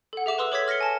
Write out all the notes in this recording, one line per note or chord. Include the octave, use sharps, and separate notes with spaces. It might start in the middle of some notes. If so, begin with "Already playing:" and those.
A4 F#5
G#4 E5 D6 E7
B4 C6 D#6 E6
A4 C#5 D6 E6 G#6 B6
F6 A#6 B6 C#7 G7
G#5 A5